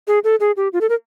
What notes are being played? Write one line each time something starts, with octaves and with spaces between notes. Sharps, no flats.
G#4
A4
G#4
G4
F4
A4
A#4